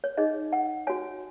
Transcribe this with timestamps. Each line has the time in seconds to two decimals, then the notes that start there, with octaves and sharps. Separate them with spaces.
0.04 C#5
0.17 D#4 G#4 C#5 D#5
0.53 F#5
0.87 F#4 C#5 G#5